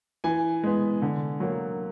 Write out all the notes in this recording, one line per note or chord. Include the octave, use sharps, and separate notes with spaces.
E3 G#5
G#3 B3
D3
F#3 A#3